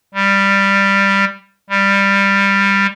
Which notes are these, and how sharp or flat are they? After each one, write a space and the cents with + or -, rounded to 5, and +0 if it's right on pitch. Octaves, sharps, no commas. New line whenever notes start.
G3 +10
G3 +15